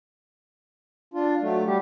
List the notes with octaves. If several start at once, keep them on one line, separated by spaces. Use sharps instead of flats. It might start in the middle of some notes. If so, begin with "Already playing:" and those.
D4 F4
F#3 A3
G3 G4